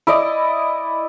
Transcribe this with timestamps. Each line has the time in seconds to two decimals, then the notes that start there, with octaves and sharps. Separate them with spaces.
0.07 E4 D5 D#5